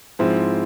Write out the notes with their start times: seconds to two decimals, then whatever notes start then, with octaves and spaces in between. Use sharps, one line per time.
0.19 G#2 F3 C4 E4